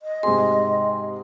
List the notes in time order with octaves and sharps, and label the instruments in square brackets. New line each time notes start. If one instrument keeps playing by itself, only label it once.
[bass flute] D#5
[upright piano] G#2 C3 G#4 [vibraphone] C6